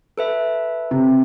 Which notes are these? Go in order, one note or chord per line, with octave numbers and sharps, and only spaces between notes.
A4 B4 E5
C3